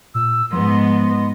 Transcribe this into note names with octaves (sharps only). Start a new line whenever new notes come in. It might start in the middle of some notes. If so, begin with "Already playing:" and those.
A#2 E6
G#2 F3 B3 D#5 C6